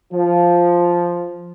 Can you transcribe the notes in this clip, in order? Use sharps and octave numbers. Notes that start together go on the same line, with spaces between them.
F3